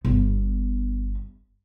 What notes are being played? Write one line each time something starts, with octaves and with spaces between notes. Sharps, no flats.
G1 B3